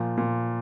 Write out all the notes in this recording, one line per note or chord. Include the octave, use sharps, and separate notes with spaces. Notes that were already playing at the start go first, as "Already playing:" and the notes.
Already playing: A#2 F3
A#2